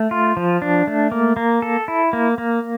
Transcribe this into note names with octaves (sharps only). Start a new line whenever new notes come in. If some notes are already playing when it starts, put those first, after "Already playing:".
Already playing: A3
F4
F3
D4
A3
A#3
A#3
A4
E4
A#3
A#3